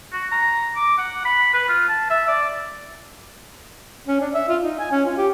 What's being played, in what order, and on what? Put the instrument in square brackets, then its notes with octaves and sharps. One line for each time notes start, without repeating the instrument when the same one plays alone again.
[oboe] F#4
A#5
D6
F#5
B5
B4
F4
A5
E5
D5
[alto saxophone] C#4
D4
E5
F4
D#4
G#5
C#4
F4
G4